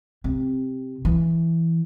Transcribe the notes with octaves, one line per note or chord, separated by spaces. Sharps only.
C3
E3